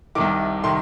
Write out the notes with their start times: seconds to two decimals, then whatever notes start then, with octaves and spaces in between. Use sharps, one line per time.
0.15 C2 C3 D#3 D6
0.64 C3 D#3 C6